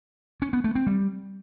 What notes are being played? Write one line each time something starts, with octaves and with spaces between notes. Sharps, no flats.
C#4
B3
A3
C4
G3